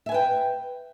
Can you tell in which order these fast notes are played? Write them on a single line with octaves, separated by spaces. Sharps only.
E5 G#5 B4 G5